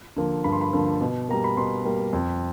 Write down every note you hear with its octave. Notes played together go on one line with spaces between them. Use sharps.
D3 F3 A#3
G2 B5
C6
B5
D3 F3 A#3
B2
G3 A#3 A#5
B5
B2 C6
G3 A#3
F2